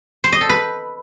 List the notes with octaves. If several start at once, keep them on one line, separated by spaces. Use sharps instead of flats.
C5
D#5
A4
B4